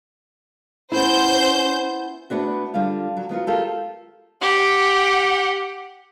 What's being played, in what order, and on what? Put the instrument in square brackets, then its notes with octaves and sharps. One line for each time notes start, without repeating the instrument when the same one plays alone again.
[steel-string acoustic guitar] B3 E4 [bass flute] C#4 [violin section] C5 G6
[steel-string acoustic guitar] A3 B3 D4 F#4
D3 G3 F4 F5
F#3
D#3 B3 F4 F#4
F4 G4 A4 A#4
[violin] G4 F#5